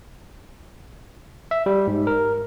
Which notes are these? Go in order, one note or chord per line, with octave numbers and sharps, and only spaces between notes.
E5
G3
G#2
A#4